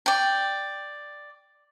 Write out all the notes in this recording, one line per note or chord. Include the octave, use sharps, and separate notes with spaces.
D5 G5